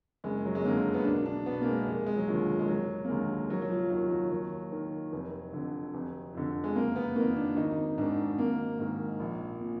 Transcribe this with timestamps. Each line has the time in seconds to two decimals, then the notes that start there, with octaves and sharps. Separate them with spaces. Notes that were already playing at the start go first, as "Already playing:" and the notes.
0.24 F#1 G#3
0.45 F#3
0.55 G#3
0.64 F2 D3 A#3
0.94 B3
1.05 B1 D4
1.26 D4
1.46 B2 B3
1.61 A#3
1.66 G#3
1.86 F1 G#3
2.06 G#3
2.17 F#3
2.28 D#2 D3 F3
2.59 G#3
2.68 F1 F#3
3.05 A#3
3.08 D#2 D3 G#3
3.49 F1 F#3
3.62 F#3
3.70 F3
3.90 D#2 D#3 F#3
4.11 F#3
4.31 D#2 F#3
4.72 D#3
5.12 F1
5.53 F2 D3
5.94 F1
6.34 F2 D3
6.64 G#3
6.75 F#1 A#3
6.96 B3
7.16 F2 D#3 A#3
7.36 D4
7.56 G#1 D#4
7.98 G#2 D#3 D4
8.38 G#1 A#3
8.79 G#2 D#3
9.20 A#1
9.61 A#2